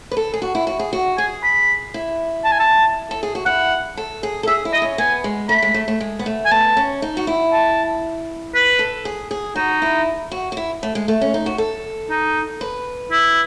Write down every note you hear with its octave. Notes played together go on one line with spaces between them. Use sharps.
B4
A4
G#4
F#4
E4
F#4
G#4
F#4
G#4 G#5
B5
E4
A5
G#5
A5
A4
G#4
F#4
E4 F#5
A4
G#4
A4
G#4 E5
E4
D#5
C#4
B3 G#5
G#3
A3 B5
G#3
A3
A3
G#3
B3
A3
G#5
B3 A5
C#4
D#4
F#4
E4
A5
B4
A4
G#4
G#4
D#4 F#4
E4
F#4
F#4
E4
A3
G#3
A3
C#4
D#4
F#4
A4
D#4
B4
E4